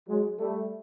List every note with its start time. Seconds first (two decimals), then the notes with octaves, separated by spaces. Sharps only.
0.08 F#3 G#3
0.39 G3 A3